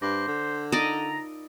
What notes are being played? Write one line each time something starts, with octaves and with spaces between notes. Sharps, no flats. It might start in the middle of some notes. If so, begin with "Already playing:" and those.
G2 C5 D6 A#6
D3
D#4 F4 A#4 D5 D#5 A#5